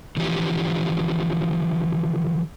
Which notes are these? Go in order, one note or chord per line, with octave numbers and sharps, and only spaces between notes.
D3 E3 F3 G4